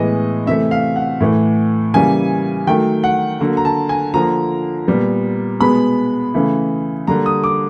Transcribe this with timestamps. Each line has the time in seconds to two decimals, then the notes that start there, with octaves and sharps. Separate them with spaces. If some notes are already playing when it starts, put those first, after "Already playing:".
Already playing: A2 E3 G#3 B3 D#5
0.47 C3 E3 A3 E5
0.71 F5
0.96 F#5
1.21 A2 E3 A3
1.94 C#3 E3 G3 A#3 G#5
2.67 D#3 F#3 A3 G5
3.04 F#5
3.40 D3 F#3 A#3
3.57 A#5
3.65 A5
3.89 G#5
4.14 D3 F3 A#3 A#5
4.88 A#2 G3 B3
5.60 B2 G#3 B3 B5
6.34 C#3 E3 A3
7.07 D3 G3 A#3 A#5
7.26 D#6
7.44 D6